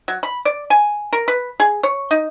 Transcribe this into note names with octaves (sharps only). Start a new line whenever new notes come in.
F#3
B5
D5
G#5
A#4
B4
G#4
C#5
D#4